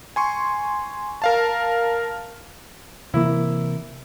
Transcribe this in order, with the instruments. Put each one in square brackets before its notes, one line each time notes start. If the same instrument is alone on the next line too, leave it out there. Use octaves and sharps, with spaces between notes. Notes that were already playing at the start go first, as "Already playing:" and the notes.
[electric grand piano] G#5 C6 C#6
A#4 F5 A5
[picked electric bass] C3 E3 A#3 [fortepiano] E4